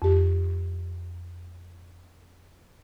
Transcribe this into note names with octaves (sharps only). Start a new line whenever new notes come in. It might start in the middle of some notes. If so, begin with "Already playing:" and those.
F2 G4